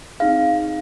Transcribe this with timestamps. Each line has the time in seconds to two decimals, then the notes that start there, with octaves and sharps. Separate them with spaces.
0.20 C4 D#4 G#4 F5